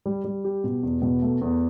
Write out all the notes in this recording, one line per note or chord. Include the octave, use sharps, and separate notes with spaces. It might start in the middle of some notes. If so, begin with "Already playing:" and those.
G3
G3
G4
B2
E2
B2
A3
E2